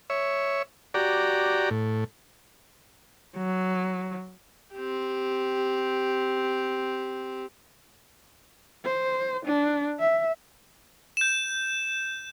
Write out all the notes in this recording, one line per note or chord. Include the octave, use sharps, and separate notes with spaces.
C#5 E5
F#4 G4 D5 A#5
A2
F#3
C4 G4
C5
D4
E5
G6 E7